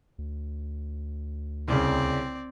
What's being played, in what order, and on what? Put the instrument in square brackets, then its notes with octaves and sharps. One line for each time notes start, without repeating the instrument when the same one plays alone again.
[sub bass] D2
[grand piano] C2 C#3 [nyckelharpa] C4 D5